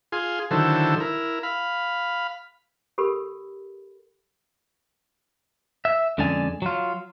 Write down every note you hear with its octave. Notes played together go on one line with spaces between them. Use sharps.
F4 G#4 C6
D3 D#3 F#3 E4 A4 C5
E4 A#4
F5 B5
G4 A4 A#4 B5
E5
F2 D3 G#3 C#4 D5 G#5
F#3 F4